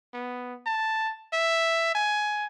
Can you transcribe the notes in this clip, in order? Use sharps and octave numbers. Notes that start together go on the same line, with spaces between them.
B3
A5
E5
G#5